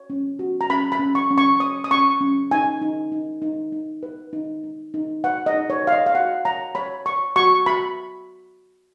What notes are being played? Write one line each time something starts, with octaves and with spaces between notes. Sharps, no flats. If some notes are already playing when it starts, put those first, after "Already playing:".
Already playing: C#5
C#4
F#4
A#5
C#4 B5
B5
C#4
C#6
C#4
C#6
C#5 D#6
D#6
C#4 C#6
C#4
D#4 G#5
D#4
D#4
D#4
D#4
B4
D#4
D#4
D#4
B4 F#5
D#5
D#4
C#5
B4 F5
D#5
F5
F#4 F#5
C#5 A#5
C#5 B5
C#5 C#6
F#4 C#6
F#4 B5